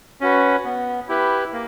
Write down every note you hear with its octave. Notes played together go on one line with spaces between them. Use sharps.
C#4 F#4 B4
B3
E4 G4 B4
A#3